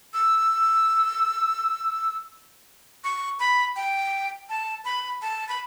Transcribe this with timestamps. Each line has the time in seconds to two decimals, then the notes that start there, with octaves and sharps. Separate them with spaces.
0.14 E6
3.04 C#6
3.40 B5
3.76 G5
4.49 A5
4.85 B5
5.22 A5
5.49 B5